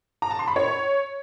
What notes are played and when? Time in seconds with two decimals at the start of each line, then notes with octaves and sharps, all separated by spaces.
0.22 A#5
0.31 A5
0.39 C6
0.48 B5
0.56 C#5